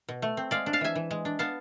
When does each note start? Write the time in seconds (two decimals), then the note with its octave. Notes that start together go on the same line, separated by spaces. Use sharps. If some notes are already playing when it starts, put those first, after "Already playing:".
0.09 B2
0.22 A3
0.37 C4
0.51 G#3 D5 F5
0.66 D4
0.73 F5 A5
0.81 E3 E5 G#5
0.95 E3
1.11 G#3
1.25 D4
1.39 B3 F5 A5